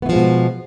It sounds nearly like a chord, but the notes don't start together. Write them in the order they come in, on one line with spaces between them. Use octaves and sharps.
B3 E3 F3 G#3 B2